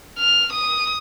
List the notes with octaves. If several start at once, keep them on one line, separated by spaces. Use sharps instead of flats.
F6
D#6